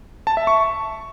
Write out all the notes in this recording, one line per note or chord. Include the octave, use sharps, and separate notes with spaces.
A5
E5
C#6